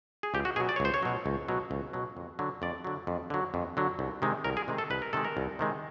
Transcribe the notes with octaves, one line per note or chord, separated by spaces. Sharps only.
G#4
C#2 G4
F#4
B2 F#3 G#4
D5
C#5
C#2 C5
C#5
B2 F#3
C#2
B2 F#3
C#2
B2 F#3
F2
D3 F#3
F2 D5
D3 F#3
F2
D3 F#3
F2
D3 F#3
C2
C3 D#3 G#3
C2 A#4
G#4
C3 D#3 G#3
A4
C2 B4
A#4
C3 D#3 G#3 A4
A#4
C2
C3 D#3 G#3